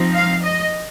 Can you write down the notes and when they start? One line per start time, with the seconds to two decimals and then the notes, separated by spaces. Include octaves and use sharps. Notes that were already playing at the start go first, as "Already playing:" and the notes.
Already playing: F3 C4 D#4
0.14 F5
0.43 D#5